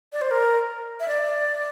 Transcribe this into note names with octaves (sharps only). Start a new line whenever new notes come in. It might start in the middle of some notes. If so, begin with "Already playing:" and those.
D5
C5
A#4
E5
D5